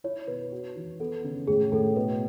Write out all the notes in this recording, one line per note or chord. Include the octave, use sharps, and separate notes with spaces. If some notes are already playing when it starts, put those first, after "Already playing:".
E4 C#5
B2 B4
F#4
E3
B3 A4
C#3
A2 G#4
A2 A4
B2 B4